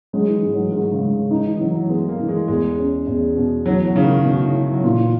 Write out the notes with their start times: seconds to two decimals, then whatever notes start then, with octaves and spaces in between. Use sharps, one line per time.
0.13 F#3 G#3
0.28 E3
0.42 G#2 E3
0.53 F#3
0.57 E3
0.72 G#2 D#3
0.92 C#3
1.01 G#3
1.12 C#3
1.31 D#3 D#4
1.46 E3
1.60 E3 F#3
1.75 F#3
1.89 G#3 B3
2.09 A#3
2.19 E3
2.28 G#3
2.48 E2 G#3
2.78 C#4
3.07 E2
3.36 B2
3.66 E3 F#3
3.85 F#3
3.95 C#3 E4
4.05 D#3
4.24 B2 E4
4.44 C#3
4.54 E4
4.72 F#3
4.84 A#2 E3
4.99 E3